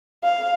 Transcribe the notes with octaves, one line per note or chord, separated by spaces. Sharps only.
F5